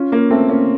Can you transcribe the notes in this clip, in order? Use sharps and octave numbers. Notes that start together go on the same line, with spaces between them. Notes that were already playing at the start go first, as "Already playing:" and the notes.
Already playing: C#4 F4
A#3 C#4
A3 C4
A#3 C#4